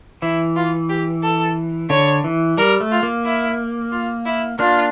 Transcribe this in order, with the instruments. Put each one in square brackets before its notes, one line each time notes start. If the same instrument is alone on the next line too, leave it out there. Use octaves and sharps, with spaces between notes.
[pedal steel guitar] E3 [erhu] E4
[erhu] F4
G4
A4
[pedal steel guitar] D3 [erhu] C#5
[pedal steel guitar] E3
[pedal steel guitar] G3 [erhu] A#4
[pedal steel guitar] A3
[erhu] F4
[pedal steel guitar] A#3
[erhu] E4
F4
E4
[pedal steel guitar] A#3 D4 [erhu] F4